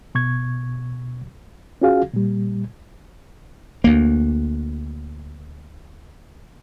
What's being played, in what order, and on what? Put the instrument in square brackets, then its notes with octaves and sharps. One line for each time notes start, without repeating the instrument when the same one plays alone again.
[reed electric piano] B2 C#6 G#6
C#4 F4 F#4 G#4 F5
A#2 G3
[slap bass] D2 A#3